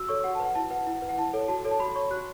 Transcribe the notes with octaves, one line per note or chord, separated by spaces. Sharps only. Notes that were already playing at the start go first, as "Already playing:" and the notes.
Already playing: F#4 E6
A4 C#5 C#6
F#4 F#5
B4 A5
F#5
E4 A5
B4 F#5
E4
B4
F#5
E4 A5
A4 C#5
F#4 A5
A4 C#5
A5
F#4 B5
C#5 C#6
F#4 F#6